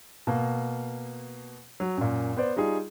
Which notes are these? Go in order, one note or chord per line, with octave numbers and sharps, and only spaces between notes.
B2 A#3
F#3
F#2 A#2
B3 C5 D5
G3 D#4 F4 G#4